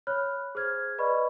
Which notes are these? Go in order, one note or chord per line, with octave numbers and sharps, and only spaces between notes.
C#5 B5 F6 F#6
G#4 C5 F6 G#6
B4 D5 D#5 B5 C#6